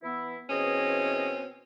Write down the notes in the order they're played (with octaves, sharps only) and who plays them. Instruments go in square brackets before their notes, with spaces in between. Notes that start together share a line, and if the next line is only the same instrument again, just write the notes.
[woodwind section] E3 B3 E4
[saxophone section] B2 C4 C#4 [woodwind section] E3 G#4 D#5